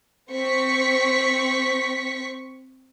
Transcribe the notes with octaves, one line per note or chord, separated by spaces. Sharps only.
C4 C#6 B6